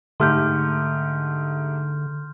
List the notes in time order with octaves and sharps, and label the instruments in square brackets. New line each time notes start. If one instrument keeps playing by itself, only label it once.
[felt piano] G#2 A3 G4 [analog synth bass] D3 [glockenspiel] C6 F6 G6